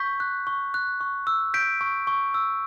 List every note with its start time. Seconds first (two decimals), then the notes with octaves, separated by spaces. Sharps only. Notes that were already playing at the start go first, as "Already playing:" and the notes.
Already playing: C#6 G6 B6
0.20 F#6
0.47 C#6
0.74 F#6
1.01 C#6
1.27 E6
1.54 G6 B6 D7
1.81 C#6
2.07 C#6
2.34 E6